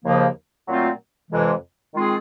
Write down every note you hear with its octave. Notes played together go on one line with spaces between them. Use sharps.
D#2 C#3 F3 A#3
A#2 F#3 A3 C4 F4
F2 C3 E3 G#3
D#3 G#3 C4 F4 G#4